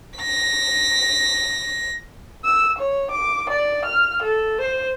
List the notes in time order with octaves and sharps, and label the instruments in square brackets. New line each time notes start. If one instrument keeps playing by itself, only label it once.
[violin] A#6 B6
[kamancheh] E6
C#5
D6
D5
F6
A4
C5